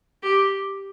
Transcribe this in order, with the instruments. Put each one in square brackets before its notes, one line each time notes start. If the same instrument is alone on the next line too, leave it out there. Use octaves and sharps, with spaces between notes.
[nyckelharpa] G4